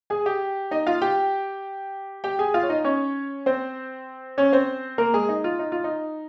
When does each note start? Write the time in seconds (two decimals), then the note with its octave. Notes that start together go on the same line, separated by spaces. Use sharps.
0.10 G#4 G#5
0.26 G4 G5
0.71 D#4 D#5
0.87 F4 F5
1.02 G4 G5
2.24 G4 G5
2.39 G#4 G#5
2.54 F4 F5
2.63 C#5
2.69 D#4 D#5
2.84 C#4 C#5
3.46 C4 C5
4.38 C#4 C#5
4.52 C4 C5
4.98 A#3 A#4
5.14 G#3 G#4
5.29 D#4
5.44 F4
5.59 D#4
5.72 F4
5.84 D#4